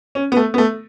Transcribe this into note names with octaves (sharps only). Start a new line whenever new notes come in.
C#4
B3
A3
B3
A3